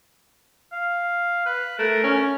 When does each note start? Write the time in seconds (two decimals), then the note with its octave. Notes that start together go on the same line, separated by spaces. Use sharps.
0.72 F5
1.46 B4
1.79 A3 A#4
2.04 C#4